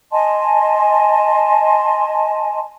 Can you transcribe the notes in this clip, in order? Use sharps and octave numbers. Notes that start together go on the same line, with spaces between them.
D#5 G#5 A5 C6